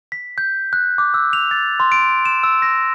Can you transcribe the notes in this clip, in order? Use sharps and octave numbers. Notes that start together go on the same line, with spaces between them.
B6
G6
F#6
D6
E6
F7
A6
C6
D7
E7
E6
A#6